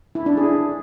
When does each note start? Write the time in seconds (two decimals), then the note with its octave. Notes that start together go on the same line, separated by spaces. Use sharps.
0.15 E4
0.26 D4
0.37 G#4